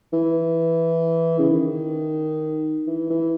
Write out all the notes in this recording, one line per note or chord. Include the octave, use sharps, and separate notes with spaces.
E3
C#3
D#3
E3
E3